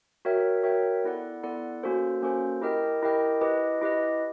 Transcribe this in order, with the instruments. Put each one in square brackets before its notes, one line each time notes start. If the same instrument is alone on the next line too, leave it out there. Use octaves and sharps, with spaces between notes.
[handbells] F#4 A#4 C#5 E5 G5
F#4 A#4 C#5 E5 G5
B3 E4 A4 D5 F#5
B3 E4 A4 D5 F#5
A#3 C#4 F#4 A4 C5
A#3 C#4 F#4 A4 C5
E4 G4 A#4 D#5 G5
E4 G4 A#4 D#5 G5
E4 G4 B4 D#5
E4 G4 B4 D#5